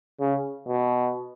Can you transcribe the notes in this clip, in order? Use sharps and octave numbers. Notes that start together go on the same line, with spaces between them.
C#3
B2